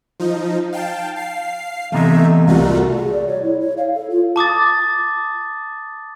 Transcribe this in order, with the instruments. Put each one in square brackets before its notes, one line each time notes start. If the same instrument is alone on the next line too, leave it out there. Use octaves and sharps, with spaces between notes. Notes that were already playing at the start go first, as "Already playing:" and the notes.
[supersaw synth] F3 D#4
F5 G5 A5
F5 C7
[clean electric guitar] E2 C3 D#4 [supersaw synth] A3 E5
[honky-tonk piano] C2 [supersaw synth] A3 F4 F#4
[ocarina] G#4
D5
C#5
E4
C#5
F5
A4
F4
[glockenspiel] A5 D6 D#6 A6